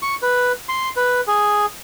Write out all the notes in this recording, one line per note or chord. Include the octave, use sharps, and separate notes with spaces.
C#6
B4
C6
B4
G#4